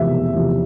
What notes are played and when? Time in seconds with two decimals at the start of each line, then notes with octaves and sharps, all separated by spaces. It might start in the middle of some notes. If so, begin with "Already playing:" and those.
Already playing: E2 C3 F3 E5
0.11 E1
0.34 E2 C3 F3